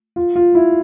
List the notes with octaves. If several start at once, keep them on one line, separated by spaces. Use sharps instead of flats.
F4
F4
E4